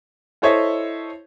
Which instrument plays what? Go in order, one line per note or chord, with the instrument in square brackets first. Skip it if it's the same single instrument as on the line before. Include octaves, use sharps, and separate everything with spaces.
[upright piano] E4 A4 C5 C#5 D#5 E5